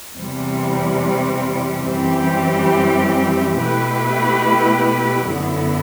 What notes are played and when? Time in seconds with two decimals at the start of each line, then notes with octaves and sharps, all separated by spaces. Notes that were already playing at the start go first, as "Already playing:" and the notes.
0.14 E2 C3 E3 G3
1.86 F#2 E3 G3 C4 G4
3.57 B2 A3 E4 G4 B4
5.28 F#2 D3 F#3 B3 E4